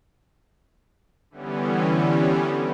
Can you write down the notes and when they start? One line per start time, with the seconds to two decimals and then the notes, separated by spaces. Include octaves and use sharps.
1.30 D3 E3 G3 B3 C#4